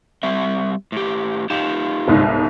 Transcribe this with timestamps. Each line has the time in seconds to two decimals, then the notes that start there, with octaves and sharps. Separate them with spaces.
0.23 G3 C4 E5
0.92 A2 G4
1.50 D#4 F4 G4 E7 F7
2.08 G1 C2 G#2